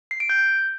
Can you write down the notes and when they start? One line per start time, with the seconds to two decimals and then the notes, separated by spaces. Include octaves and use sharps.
0.11 C7
0.20 D7
0.29 G6